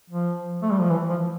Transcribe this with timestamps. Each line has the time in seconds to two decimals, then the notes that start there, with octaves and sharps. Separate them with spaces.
0.10 F3
0.63 A3
0.71 G3
0.80 F3
0.90 E3
1.10 F3